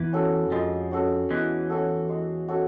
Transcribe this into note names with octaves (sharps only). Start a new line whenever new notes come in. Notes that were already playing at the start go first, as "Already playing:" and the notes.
Already playing: E2 E3
C#4 F#4 A4
F2 F3 G#3
C#4 F#4 A4
E2 E3 G#3
C#4 F#4 A4
G#3
C#4 F#4 A4